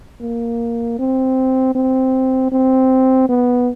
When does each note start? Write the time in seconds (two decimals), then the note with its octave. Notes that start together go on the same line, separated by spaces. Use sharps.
0.21 A#3
0.99 C4
1.75 C4
2.52 C4
3.29 B3